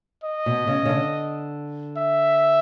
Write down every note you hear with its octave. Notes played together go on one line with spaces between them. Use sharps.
D#5
B2
C#3
C#3
D3
E5